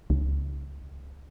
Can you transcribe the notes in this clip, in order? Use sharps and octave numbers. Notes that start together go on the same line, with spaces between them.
C#2